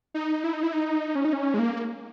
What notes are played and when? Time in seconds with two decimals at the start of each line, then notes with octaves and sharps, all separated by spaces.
0.14 D#4
0.44 E4
0.53 D#4
0.63 E4
0.73 D#4
1.15 C#4
1.25 D#4
1.33 C#4
1.54 G#3
1.59 A#3